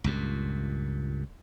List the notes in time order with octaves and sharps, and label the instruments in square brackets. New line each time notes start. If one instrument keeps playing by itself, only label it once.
[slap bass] C#2 G2 A#2